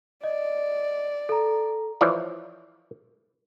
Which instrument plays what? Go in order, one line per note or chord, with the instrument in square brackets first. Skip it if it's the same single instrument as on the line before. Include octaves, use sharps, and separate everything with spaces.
[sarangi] D5 [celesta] D#5
[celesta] A4 A#5
[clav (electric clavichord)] E3 F3 C#5 D5